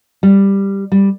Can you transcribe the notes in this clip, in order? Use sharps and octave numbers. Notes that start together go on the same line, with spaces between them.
G3
G3